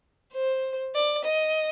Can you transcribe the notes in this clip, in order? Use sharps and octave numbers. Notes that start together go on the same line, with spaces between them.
C5
D5
D#5